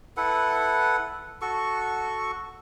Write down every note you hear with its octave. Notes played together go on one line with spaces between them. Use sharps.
E4 A4 B4 F#5
F#4 A4 C#6